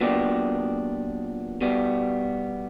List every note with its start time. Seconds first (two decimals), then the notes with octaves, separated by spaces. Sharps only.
0.01 A#2 F#3 B3 D4 G4
1.61 B2 G3 B3